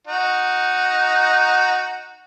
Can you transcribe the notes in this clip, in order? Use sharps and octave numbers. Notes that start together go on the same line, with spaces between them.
D#4 F#4